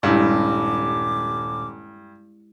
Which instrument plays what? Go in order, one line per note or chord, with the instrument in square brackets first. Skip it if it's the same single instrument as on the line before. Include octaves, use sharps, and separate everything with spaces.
[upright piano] D#1 [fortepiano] G2 [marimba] G#3 E4 G4 [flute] D6